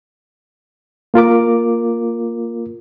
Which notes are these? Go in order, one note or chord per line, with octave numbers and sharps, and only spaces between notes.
A#3 F4 A#4 D6